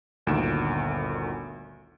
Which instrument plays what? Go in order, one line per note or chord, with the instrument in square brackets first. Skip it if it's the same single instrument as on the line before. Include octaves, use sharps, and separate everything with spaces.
[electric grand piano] G1 D2 A#2 D#3 D7 E7